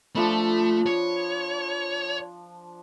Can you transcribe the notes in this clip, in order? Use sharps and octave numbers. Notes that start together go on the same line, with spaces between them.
F3 A3 D4 B5
C#5